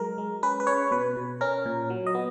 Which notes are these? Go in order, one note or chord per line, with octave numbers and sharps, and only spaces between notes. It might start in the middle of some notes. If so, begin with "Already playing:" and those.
Already playing: F#3 G#3 A#4
G#3
C#4 B4
B4
C#4 C#5
B2 B4
B2
C#4 A#4
A#2
F#3
D#5
B3